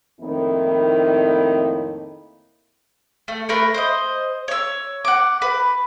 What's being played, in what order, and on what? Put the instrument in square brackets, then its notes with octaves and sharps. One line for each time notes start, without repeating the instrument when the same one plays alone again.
[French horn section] F2 A2 D#3 A#3 C4 E4
[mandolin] A3
A3 A#4 B4
C5 D#5
C#5 E6
F#5 D6
B4